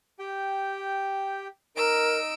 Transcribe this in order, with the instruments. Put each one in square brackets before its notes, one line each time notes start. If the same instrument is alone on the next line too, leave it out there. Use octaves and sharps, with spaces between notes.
[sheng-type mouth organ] G4 G5
[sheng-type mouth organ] D#4 D#5 [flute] A#4 [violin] E6 D7